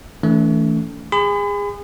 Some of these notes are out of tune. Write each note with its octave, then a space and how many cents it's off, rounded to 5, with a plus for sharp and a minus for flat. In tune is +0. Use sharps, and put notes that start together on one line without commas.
E3 -30 A3 +0 C#4 +45
G#4 -30 B5 +40